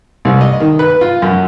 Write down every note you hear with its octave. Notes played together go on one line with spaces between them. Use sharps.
C2
D#5
D#3
B4
F4
F#2